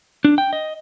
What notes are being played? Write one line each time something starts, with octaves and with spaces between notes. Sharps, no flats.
D4
G5
D#5